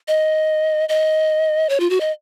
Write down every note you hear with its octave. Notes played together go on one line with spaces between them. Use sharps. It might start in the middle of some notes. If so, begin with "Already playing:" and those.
D#5
D#5
C#5
F4
F#4
D#5